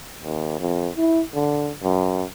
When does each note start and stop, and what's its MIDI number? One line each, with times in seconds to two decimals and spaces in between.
0.23 0.56 39
0.59 0.89 41
0.97 1.21 64
1.34 1.71 50
1.83 2.24 42